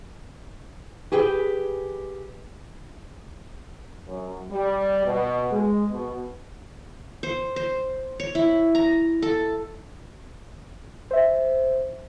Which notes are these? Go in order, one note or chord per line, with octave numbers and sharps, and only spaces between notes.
G4 G#4 B4 G5
F#2
G3
B2
G#3
B2
C5
C5
C#5
E4
A#5
A4
C5 E5